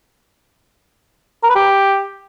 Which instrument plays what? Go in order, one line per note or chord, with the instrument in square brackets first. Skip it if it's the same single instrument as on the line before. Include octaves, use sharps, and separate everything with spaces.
[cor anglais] A#4
B4
G4